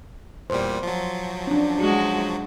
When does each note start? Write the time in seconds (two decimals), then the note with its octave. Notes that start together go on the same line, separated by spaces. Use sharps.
0.50 E2 A#2 G3 C5
0.83 F3 F#3
1.47 C#4 D4
1.80 G#3 F#4